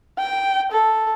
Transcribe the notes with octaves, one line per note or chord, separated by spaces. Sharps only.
G5
A4